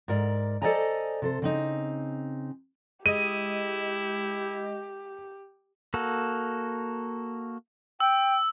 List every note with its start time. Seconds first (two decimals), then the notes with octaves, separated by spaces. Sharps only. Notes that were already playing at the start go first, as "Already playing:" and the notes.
0.08 G#2 A#4 D5
0.62 A4 C5 D5 D#5 G#5 A#5
1.22 C3 A4 C5
1.42 C#3 C4 D#4
3.06 G#3 E4 G4 D#5 D#7
5.94 A#3 F#4 A4
8.00 G5 E6